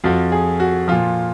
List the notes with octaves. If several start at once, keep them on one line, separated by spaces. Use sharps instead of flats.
F2 F3 F#4
G#4
F#4
A#2 F3 F4